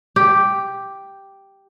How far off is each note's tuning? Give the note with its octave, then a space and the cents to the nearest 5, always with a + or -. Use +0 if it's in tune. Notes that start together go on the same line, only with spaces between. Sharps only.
G4 +0